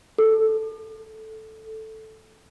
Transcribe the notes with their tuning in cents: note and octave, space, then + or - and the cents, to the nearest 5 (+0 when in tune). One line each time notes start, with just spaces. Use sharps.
A4 -5